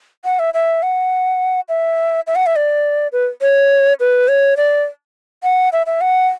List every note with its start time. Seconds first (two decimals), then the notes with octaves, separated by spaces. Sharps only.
0.25 F#5
0.39 E5
0.54 E5
0.83 F#5
1.69 E5
2.27 E5
2.36 F#5
2.46 E5
2.56 D5
3.13 B4
3.41 C#5
4.00 B4
4.28 C#5
4.57 D5
5.43 F#5
5.73 E5
5.86 E5
6.01 F#5